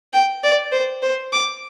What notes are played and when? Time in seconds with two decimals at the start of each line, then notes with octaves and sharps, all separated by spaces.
0.13 G5
0.43 D5
0.72 C5
1.02 C5
1.32 D6